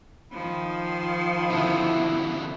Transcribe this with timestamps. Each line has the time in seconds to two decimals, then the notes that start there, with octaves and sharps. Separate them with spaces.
0.32 D#3 F3 B5
1.50 B2 D3 E4